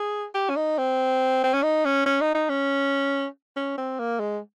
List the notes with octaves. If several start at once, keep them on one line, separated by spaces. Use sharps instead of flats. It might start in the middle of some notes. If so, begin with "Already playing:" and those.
Already playing: G#4
G4
C#4
D#4
C4
C4
C#4
D#4
C#4
C#4
D#4
D#4
C#4
C#4
C4
A#3
G#3